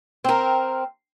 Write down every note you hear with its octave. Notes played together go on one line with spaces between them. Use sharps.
C4 A#4